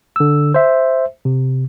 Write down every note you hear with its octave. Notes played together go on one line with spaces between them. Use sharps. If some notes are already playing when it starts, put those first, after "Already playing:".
D3 E6
C5 E5
C3